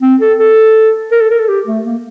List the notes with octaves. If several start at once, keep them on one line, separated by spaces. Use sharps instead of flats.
C4
A4
A4
A#4
A4
A#4
A4
G4
A3
A#3